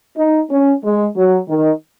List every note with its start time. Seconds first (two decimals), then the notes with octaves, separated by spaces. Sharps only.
0.17 D#4
0.50 C#4
0.83 G#3
1.15 F#3
1.48 D#3